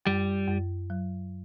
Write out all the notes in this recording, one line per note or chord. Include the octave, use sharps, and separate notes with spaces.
F#2 G3
F#2
F#3